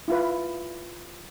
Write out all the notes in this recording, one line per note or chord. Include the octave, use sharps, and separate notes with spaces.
E4 F4 B4